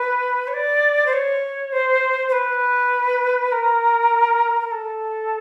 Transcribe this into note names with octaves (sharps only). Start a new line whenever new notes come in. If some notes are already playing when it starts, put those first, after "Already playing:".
Already playing: B4
C#5
D5
C5
C#5
C5
C5
B4
A#4
A#4
A4